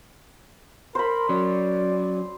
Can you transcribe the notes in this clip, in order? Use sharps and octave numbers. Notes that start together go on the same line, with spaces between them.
A#4 C5 B5
F#3 C#4 D5